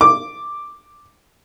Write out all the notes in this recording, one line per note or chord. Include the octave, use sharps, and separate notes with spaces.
D6